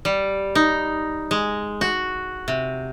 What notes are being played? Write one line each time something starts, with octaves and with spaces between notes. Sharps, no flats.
G3
D#4
G#3
F#4
C3